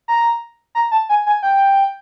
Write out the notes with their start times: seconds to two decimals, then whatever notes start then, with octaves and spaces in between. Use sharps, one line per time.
0.08 A#5
0.75 A#5
0.92 A5
1.09 G#5
1.26 G#5
1.43 G5